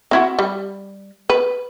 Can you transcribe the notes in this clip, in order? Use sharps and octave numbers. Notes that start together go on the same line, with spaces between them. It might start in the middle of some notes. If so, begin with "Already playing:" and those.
C4 E4 F#4
G3
B4